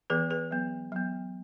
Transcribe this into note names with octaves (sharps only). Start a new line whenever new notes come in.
E3 B3 G#4 B4
G#4 B4
F#3 B3
F#3 B3